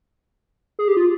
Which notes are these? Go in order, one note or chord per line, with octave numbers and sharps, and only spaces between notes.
G#4
G4
F4